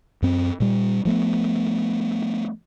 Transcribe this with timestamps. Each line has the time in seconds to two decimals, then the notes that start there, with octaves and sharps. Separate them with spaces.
0.22 F#2 C4
0.60 A#2 G3
1.05 F3 A3 B3